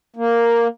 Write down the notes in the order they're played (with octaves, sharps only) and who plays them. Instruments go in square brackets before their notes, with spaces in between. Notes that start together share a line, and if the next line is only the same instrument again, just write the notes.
[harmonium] A#3